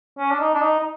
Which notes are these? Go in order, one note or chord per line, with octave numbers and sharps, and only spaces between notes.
C#4
D4
D#4
D4
D#4
D#4